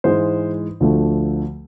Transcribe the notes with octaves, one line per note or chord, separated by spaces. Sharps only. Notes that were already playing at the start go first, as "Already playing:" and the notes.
G#2 E3 G#3 C5
D2 D3 F3 A3